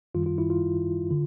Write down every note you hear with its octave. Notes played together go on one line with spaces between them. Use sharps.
F#2 D#3 G3 F4
F4
E4
F4
D3